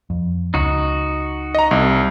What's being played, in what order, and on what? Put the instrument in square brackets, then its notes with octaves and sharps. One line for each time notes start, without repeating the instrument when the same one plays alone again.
[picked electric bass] F2
[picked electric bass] C#2 [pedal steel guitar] D#4 F#4
[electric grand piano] D#5 A#5
C2